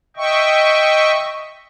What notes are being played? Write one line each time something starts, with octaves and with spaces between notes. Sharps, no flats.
D#5 E5 G5 C#6